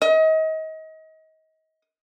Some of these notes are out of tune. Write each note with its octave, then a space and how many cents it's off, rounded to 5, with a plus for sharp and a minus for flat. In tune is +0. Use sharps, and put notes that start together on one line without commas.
D#5 +30